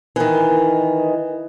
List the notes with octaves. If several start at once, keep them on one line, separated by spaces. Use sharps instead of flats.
D#3 E3